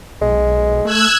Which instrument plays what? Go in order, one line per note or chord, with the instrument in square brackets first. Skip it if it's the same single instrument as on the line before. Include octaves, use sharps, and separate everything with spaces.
[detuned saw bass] B1 [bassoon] G#3
[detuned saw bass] A3 [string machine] E6 F#6 G#6